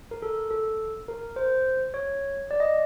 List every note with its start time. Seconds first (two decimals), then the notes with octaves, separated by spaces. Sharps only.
0.11 A#4
0.22 A4
0.51 A4
1.08 A#4
1.36 C5
1.94 C#5
2.51 D5
2.60 D#5